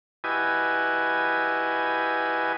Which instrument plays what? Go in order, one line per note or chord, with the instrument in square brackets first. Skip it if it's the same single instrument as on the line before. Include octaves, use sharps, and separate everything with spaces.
[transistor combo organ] E4 F#4 G4 B4 D#5 G#5